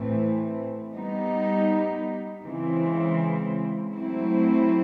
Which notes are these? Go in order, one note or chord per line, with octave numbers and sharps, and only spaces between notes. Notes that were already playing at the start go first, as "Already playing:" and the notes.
Already playing: A2 E3 A3 C4
G3 B3 D#4
C#3 E3 G#3 C4
F#3 A3 C4 E4